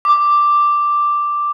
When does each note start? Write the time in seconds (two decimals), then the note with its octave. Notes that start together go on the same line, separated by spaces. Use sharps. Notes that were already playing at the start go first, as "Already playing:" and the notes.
0.05 D6